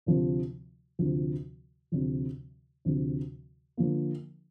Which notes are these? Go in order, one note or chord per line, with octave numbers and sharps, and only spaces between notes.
D2 C3 F3
D2 C3 F3
D2 C3 F3
D2 C3 F3
D3 F3 A#3